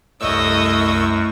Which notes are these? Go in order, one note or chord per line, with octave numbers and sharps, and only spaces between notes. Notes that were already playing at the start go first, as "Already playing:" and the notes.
C2 F#2 A2 D#5 C#6 E6